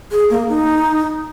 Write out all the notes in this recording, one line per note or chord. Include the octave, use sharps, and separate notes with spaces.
G#4
A#3
D#4